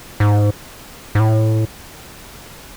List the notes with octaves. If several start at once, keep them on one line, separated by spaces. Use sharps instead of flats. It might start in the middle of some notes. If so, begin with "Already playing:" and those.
G#2
G#2
A2